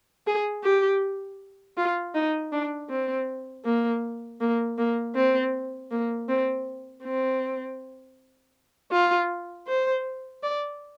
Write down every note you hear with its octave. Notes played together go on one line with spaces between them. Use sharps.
G#4
G4
F4
D#4
D4
C4
A#3
A#3
A#3
C4
A#3
C4
C4
F4
C5
D5